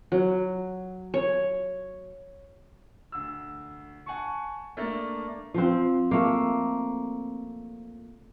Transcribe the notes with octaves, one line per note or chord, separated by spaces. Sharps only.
F#3
C#5
D2 E6
F#5 G#5 A5 C#6
A3 A#3 D4
F3 C4
A3 A#3